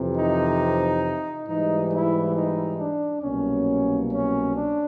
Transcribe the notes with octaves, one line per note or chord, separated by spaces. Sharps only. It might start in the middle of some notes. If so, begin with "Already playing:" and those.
Already playing: F2 C3 E3
D#4
G#2 E3 G3 D#4
E4
D#4
D4
C2 B2 F#3 A#3 C#4
C#4
D4